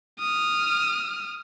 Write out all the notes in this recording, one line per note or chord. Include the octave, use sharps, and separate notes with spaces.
D#6 F6